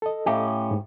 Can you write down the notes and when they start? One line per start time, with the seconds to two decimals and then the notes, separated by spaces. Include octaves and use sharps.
0.02 A4 D#5
0.26 A2 C#4 G4 E5 F5 A#5
0.71 G#2